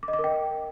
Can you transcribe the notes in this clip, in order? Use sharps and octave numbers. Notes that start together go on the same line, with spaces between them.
D6
D#5
D6
A#4
G5